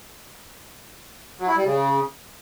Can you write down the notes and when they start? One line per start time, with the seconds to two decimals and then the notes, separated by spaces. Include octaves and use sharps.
1.39 F#3
1.48 E4
1.56 G3
1.65 C#3